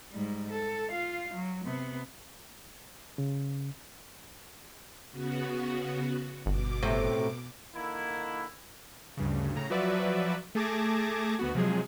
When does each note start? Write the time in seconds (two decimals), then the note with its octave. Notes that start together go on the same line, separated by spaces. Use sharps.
0.11 G#2 G3
0.51 A4
0.90 F4 F5
1.34 F#3
1.65 C3 B3
3.18 C#3
5.12 C#3 B3 F#4
6.46 G1 B2 D6
6.83 A2 C3
7.74 D3 D#3 A#3 E4
9.17 D2 G2 C#3
9.55 A2 C#3 A#5
9.70 F3 F#3 F#4 B4 D5 E5
10.55 A3 G#4 A5 D6 G#6 A#6
11.39 D2 B3 F#4
11.54 C3 F3 F#3 G#3 G#4